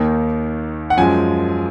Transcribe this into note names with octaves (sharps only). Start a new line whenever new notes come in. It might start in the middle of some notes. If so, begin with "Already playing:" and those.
Already playing: D#2 D#3 A#3 D#4
F#5
F#2 F3 G#3 G#5